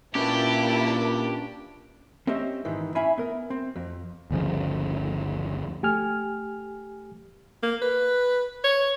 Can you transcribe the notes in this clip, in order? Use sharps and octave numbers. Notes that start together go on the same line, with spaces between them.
A#2 A#3 C#4 D4 E4 G4 B4 A5
C4 C#4 G4 D#5 E5
G#2 D#3 E3
C#4 E4 E5 F5 G#5 B5
B3 A#4
C4
F2
G1 D2 C#3 F3
A3 G4 G#5 F6
A#3
B4
C#5